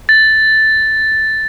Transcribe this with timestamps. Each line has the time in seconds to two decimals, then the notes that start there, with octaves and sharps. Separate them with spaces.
0.09 A6